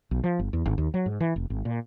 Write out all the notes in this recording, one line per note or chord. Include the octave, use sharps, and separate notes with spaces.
B1
F3
G1
E2
G#1
D#2
F#3
G#2
E3
F1
G#1
A#2